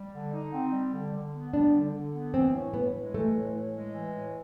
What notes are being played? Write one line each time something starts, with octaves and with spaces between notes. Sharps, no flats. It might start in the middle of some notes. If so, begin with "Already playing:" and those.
Already playing: G3
D3
D#4
C4
G3
D3
D3
B3
G3 D4
D3
D3
B3
E3 C4
A2
A2 B3
G#3
E3 A3
A2
A2
G#3
E3
A2